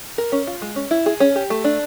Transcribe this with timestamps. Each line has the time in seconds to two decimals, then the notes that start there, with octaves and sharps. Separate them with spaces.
0.18 A#4
0.32 C#4
0.47 F4
0.62 G#3
0.76 C#4
0.91 E4
1.06 G#4
1.20 C#4
1.36 G4
1.50 A3
1.64 D4